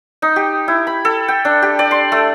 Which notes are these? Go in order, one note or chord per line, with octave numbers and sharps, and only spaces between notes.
D#4
G4
E4
B5
A4
G5
D4
G4
D5
C6
A3